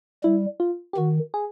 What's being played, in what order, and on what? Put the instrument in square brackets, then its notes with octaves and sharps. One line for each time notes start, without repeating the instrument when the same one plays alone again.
[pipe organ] G3 [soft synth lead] E4
[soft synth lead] F4
G4
[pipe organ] D#3 [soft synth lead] F#4
[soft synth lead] G#4